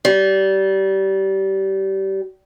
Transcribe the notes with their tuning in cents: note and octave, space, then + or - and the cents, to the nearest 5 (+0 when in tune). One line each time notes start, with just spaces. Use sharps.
G3 -25